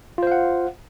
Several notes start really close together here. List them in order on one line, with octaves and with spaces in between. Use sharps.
F4 C5 F5 F#5